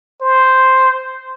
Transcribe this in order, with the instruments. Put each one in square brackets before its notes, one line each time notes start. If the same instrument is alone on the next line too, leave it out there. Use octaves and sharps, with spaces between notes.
[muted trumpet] C5